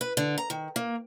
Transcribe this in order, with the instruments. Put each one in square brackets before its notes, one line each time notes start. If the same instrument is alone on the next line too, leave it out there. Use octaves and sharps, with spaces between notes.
[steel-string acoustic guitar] B4
D3
A#5
D#3
A#3